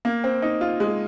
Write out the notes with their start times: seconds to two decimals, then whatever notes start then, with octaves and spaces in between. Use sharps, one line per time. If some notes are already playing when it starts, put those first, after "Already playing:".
0.05 A#3
0.24 C4
0.42 D#4
0.61 F4
0.80 G#3